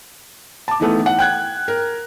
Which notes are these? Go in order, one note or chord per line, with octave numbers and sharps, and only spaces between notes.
A5 D6
D#3 E3 A3 B3
F#5
G5 F#6 G#6
A#4